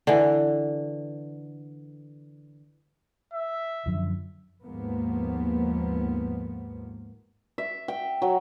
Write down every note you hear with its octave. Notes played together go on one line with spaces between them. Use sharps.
D3 E3
E5
F#2 D3 F3
D#2 G#2 F3 A#3 B3
E5
G5
F#3